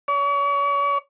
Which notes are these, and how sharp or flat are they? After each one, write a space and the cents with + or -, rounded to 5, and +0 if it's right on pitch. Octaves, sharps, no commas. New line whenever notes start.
C#5 +40